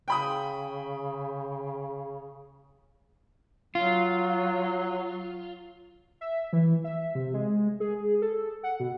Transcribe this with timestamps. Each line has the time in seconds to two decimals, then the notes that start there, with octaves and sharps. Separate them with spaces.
0.08 C#3 G5 B5 D#6
3.75 F#3 F4
6.21 E5
6.53 E3
6.84 E5
7.15 C3
7.34 G#3
7.80 G#4
8.22 A4
8.63 F#5
8.80 B2